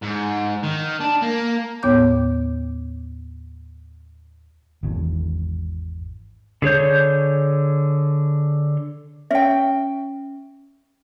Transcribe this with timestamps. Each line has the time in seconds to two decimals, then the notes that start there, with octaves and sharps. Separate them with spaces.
0.02 G#2
0.64 D#3
1.00 D4
1.22 A#3
1.83 D#2 A2 B3 C#5 D6 G6
4.83 G#1 E2
6.62 D3 G#4 C#5 G6
9.31 C#4 E5 G5